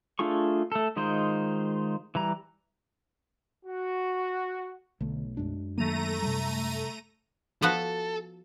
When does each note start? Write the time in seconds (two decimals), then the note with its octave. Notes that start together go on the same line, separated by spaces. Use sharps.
0.19 A3 D4 F4 G#4 C#6
0.72 A3 A4
0.96 D#3 G#3 D#4 F4 C5
2.15 E3 G3 A#5
3.65 F#4
5.00 B1 D3 A3
5.37 F#2 G#3 D4
5.78 D#3 F#3 A3 A#3 A#5 D#7
6.22 C3 G3
7.62 F3 B3 F#4 A4